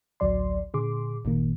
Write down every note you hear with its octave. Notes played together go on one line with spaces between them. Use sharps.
A1 D2 F#3 D5 C6
A#2 D3 G#4 C6 D6
G1 A#2 D#3 A#3